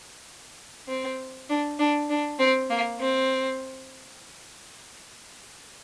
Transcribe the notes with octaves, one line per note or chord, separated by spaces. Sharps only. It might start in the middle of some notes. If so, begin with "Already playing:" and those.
C4
D4
D4
D4
C4
A#3
C4